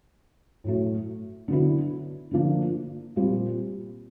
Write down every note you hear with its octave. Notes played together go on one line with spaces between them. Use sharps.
A2 F#3 A3
D3 F#3 B3 E4
D3 F3 A#3 D4
A#2 G3 C4